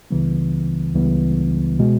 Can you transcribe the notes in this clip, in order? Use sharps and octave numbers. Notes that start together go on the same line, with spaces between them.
C#2 C#3 E3 G3 B3
C#2 C#3 E3 G3 B3
B2 G#3